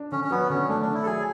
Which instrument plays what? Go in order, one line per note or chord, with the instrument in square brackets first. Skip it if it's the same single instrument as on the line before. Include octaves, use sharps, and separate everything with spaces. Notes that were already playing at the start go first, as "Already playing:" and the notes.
Already playing: [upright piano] D4
[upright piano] D3 [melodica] C#4
[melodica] C#4
[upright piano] F#3 [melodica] B3
[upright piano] D3 [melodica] C#4
[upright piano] A3 [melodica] D4
[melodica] D4
[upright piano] D3
[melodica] E4
A4
[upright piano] F#3 [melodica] G#4